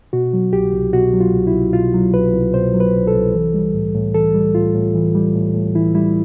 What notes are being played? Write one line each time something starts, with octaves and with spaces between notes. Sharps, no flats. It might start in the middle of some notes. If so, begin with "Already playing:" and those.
B2 F#4
F#3
C2 G4
C2
B2 F#4
F#3
F4
C2
E4
C2
B2 F4
F#3
C2 B4
C2
B2 C5
F#3
B4
C2
A4
C2
E3
G3
A2
A2
E3 A4
G3
A2 F4
A2
E3
G3
A2
A2
E3 E4
G3 E4